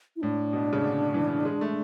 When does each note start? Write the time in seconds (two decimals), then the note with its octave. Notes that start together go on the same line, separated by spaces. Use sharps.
0.16 E4
0.22 A2 D4
0.53 B2
0.73 C#3
0.84 D3
1.14 E3
1.45 G#3
1.61 A3